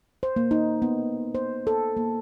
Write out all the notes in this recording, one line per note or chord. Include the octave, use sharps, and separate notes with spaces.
C5
A#3
D#4
B3
C5
A4
A#3